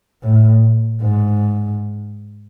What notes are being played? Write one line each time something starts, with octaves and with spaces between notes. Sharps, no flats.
A2
G#2